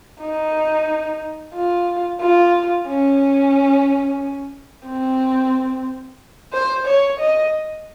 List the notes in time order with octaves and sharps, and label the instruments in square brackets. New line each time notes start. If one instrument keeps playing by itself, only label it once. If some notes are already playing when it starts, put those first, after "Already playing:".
[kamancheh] D#4
F4
F4
C#4
C4
C5
C#5
D#5